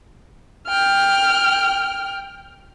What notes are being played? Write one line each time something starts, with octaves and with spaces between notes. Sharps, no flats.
G5 F6